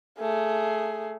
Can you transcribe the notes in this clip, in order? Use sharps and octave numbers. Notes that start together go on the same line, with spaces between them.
A3 G#4